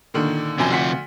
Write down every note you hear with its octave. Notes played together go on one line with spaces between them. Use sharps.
A#2 D3 D#3
E1 F#2 C3 F3 G#5
D2 F#5 B6